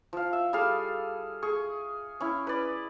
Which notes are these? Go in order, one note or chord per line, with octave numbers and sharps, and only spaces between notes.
F3 F5
E5
G3 G#4 A4 F5
G#4 C#6
C#4 E4
B4 D5